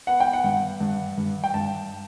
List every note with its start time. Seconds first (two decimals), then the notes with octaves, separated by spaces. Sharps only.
0.07 B3 F#5
0.20 G5
0.33 F#5
0.44 G2
0.81 G2
1.18 G2
1.44 G5
1.54 G2 A5